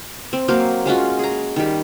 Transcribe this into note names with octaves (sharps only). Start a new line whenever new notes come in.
C4
F#3 A#3 C5 F5
G#3 C#4 F4 F#4
G#4 A#5
D#3 G3